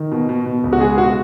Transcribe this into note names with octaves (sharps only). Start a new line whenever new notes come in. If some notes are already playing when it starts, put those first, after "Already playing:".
Already playing: D#3
B2
B2
B2
C#2
F#4
G#3 G#4
B2 F#4